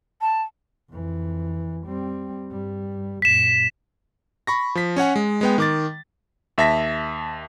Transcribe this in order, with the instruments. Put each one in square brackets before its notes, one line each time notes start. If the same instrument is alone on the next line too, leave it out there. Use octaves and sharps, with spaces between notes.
[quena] A5
[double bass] F2 E3
G3 C4
G2 G3
[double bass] F#2 A#2 [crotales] B6 E7
[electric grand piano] B5 C#6 A#6
F3 B6
C#4 C#5 F#5 G#5
G#3
G#3 B3 G5
D#3 D6 A6
D#2 E5 A5 A#6 B6